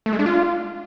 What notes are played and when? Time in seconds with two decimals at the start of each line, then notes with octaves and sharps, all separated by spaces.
0.06 A3
0.13 G#3
0.19 D4
0.26 F4